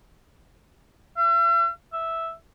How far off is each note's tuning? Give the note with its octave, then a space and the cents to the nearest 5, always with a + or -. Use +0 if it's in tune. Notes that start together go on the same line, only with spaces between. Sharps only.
E5 +45
E5 -5